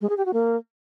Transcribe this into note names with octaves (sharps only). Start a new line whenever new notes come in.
G#3
G#4
G4
F#4
A#3